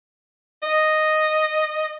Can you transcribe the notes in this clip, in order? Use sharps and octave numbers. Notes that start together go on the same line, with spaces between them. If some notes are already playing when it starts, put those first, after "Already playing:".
D#5